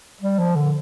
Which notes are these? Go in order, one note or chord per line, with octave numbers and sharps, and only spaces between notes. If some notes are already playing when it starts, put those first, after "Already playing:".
G3
F3
D3